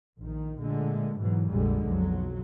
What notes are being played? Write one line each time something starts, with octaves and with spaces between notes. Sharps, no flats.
A#1 D#3
A#2 D3 G#3 A3
G#2 B2 E3 F#3
A#1 F2 D3 G3 G#3
B1 F2 F#3